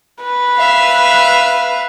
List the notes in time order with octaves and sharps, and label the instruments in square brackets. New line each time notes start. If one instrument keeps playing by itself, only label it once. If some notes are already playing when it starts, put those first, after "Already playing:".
[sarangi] B4
[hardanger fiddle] E5 F5